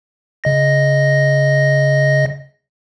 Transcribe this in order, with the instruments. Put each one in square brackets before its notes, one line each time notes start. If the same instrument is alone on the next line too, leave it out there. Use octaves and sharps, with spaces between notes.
[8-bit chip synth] C#3 D#5 A#6